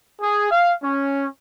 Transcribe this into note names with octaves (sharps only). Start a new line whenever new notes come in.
G#4
F5
C#4